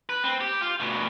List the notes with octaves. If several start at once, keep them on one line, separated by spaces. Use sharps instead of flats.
B4
C4
G4
F4
D2 B2